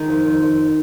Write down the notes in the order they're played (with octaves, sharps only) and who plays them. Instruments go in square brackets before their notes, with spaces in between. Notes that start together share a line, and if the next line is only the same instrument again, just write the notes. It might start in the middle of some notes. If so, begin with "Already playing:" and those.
Already playing: [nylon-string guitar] D#3 G#3 D#4
F2
F2
F2